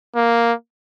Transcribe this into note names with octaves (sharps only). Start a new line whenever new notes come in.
A#3